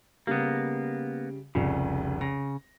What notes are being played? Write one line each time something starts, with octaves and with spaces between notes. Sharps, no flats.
C#3 G3 A#3 B3
F1 C2 C#3
C#3 A#6